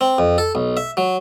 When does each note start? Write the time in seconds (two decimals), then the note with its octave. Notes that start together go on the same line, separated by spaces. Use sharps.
0.01 C4
0.18 F2
0.38 A4
0.55 B1
0.77 E5
0.97 F#3